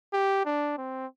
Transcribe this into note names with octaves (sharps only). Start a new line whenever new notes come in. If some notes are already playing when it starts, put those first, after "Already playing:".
G4
D4
C4